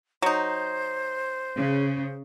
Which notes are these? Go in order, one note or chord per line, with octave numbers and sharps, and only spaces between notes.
F#3 D#4 C5
C#3